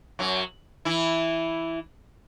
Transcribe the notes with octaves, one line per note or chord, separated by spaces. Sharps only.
F#2 F#3
E3 E4